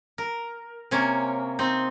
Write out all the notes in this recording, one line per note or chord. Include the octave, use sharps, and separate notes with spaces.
A#4
C3 A#3 C#4
C4 D#4